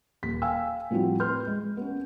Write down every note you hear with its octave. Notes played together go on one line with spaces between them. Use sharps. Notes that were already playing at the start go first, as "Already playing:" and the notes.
D#1 B6
F5 G5 G#5 E6
A2 F3 G3 C4 E4 F#4
B4 C6 F6 G6
G#3
B3 C#4